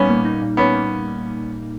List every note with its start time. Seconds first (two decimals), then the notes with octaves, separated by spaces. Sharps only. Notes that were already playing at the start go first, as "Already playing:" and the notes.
Already playing: A#2 G3 B3 C#4 D#4
0.09 A#3
0.25 D#4
0.42 A#2
0.57 G3 B3 C#4
0.74 A#3